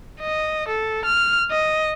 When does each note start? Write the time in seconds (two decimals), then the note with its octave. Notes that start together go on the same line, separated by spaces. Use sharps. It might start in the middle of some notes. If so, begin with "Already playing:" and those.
0.21 D#5
0.68 A4
1.05 F6
1.51 D#5